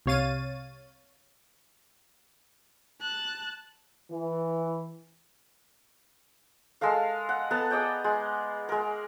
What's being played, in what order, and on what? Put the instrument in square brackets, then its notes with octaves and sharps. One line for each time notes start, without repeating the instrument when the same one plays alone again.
[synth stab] C2 C3 C#5 F5 A6 D#7
[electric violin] A5 F#6
[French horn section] E3
[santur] G#3 A4 A#4 F5
F#5
B3 A4 A5 A#5
G#4 D5 D#5 G5
G#3
G#3 A#4